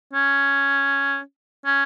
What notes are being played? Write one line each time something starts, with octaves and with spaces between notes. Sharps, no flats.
C#4
C#4